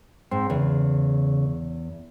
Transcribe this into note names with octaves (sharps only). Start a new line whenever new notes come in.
G#2 C4
E2 C#3